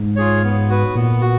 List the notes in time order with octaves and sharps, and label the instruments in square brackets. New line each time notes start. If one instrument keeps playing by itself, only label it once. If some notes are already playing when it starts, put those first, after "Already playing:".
Already playing: [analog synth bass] G#2
[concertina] F4 G#4 C#5
B3
F#4 B4
[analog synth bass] A#2 [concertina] B3
[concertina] F#4